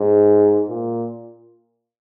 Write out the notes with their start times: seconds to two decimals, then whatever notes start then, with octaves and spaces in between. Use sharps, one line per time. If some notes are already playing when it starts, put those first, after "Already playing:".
Already playing: G#2
0.69 A#2